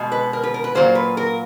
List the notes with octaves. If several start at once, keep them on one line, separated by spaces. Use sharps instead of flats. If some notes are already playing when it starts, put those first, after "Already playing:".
Already playing: B2 G#3 B3
B4
A#4
B4
A#4
B4
A#2 F#3 A#3 C5
B4
A#4